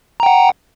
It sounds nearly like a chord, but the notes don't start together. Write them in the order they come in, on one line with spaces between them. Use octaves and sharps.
A#5 G5 F#5